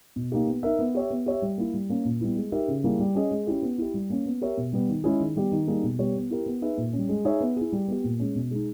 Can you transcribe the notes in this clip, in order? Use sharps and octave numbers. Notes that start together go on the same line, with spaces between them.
B2
A#3 D#4 G4
B3
D#4 A#4 E5
B3
G4 C#5 E5
B3
G4 C#5 E5
G3
A#3 E4
G3
A#3 C#4
A#2
G3 B3 E4
G#3
D#4 G4 A#4 E5
C#3
G3 A#3 E4 G#4
G3
C#4 G#4 D#5
G#3
C#4 E4 G4
B3
E4 G4
G3
A#3 C#4
B3
G4 A#4 C#5 E5
B2
G3 B3
D#3
G#3 C#4 E4 G#4
D#3
G3 B3 G4
D#3
G3 A#3 D#4 G#4
B2
G3 B3 G4 C#5
B3
E4 G4 A#4
B3
D#4 G#4 B4 E5
A#2
G3 C#4
G#3
D#4 G#4 C#5 E5
B3
E4 G#4
G3
B3 G4
A#2
G#3 C#4
B2
G#3 D#4